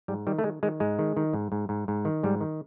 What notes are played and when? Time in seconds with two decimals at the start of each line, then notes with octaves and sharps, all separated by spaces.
0.08 G#2 G3
0.27 D#3 G3
0.39 A3
0.44 D#3 G#3
0.63 D#3 G#3
0.80 G#2 G#3
0.99 D#3
1.17 D#3
1.33 G#2
1.52 G#2
1.69 G#2
1.88 G#2
2.05 D#3
2.23 G#2 G3
2.41 D#3